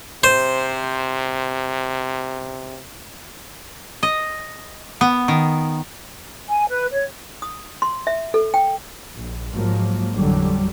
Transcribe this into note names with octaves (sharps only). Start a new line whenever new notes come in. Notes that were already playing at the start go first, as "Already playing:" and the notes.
C3 C5
D#5
B3
D#3
G#5
B4
C#5
D#6
C6
E5
A4
G5
A#1
G#2 F3 F#3 G#3 A#3
A1 F2 D3 F#3 G3